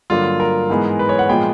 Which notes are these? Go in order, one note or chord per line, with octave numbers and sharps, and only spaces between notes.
G2 D3 F#3 A#3 F4
A#4
G#2 E3 G#3 B3
B4
C#5
F#5
A#2 F3 G#3 B3 G5